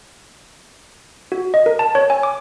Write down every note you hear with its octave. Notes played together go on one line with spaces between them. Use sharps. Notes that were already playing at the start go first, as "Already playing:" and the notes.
F#4
D#5
A#4
A5
C#5
G#5
D6